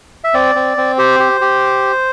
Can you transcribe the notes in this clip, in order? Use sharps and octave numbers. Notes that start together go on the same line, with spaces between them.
E5
C4 D5
C4
C4
G4 C5
G4
G4